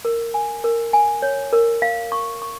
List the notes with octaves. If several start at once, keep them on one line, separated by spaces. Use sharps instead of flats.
A#4
G#5
A#4
G#5
C#5
A#4
F5
C#6
C#6